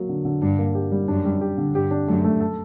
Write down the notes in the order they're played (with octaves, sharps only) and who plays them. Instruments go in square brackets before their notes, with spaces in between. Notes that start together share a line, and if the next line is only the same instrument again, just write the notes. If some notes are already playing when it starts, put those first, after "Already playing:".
Already playing: [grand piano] F#3 A#3
D3
D3
[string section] G2 [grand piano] D4
[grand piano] A#3
G4
G3
[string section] F#2 [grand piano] D4
[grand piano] G3
G4
D3
[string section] G2 [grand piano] G4
[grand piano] D4
[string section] F#2 [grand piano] A3
[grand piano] A3
A4